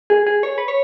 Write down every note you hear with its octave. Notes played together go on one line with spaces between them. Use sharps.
G#4
G#4
C#5
B4
C#5